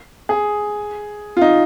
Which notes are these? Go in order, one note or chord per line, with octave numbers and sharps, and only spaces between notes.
G#4
F4
D#4